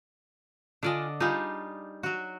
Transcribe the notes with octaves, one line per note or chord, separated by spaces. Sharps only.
D3 D4 F4 D5 D#5 G#5
G3 D4 D#4 F4 G#4
F#3 F#4